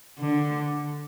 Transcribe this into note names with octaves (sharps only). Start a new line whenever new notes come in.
D3